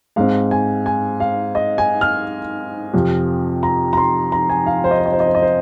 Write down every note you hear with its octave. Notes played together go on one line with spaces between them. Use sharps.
G#2 G#3 C4 F5
G#5
G#5
F5
D#5
G#5
F6
F2 C3 F3
A#5
A#5
C6
A#5
G#5
F5
C5
D#5
C5
D#5
C5
D#5
C5
D#5
C5